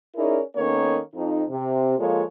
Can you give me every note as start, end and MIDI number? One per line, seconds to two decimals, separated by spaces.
0.16 0.40 61
0.16 0.40 63
0.16 0.40 64
0.16 0.40 68
0.16 0.40 70
0.16 0.40 74
0.55 0.99 51
0.55 0.99 58
0.55 0.99 59
0.55 0.99 61
0.55 0.99 69
0.55 0.99 73
1.14 1.43 41
1.14 1.43 63
1.49 1.97 48
1.98 2.22 53
1.98 2.22 56
1.98 2.22 58
1.98 2.22 65
1.98 2.22 69
1.98 2.22 73